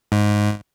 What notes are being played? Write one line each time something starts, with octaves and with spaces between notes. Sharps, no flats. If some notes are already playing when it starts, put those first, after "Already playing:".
G#2